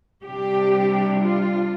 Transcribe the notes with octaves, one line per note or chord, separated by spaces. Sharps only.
C3 G3 D4 G4
F4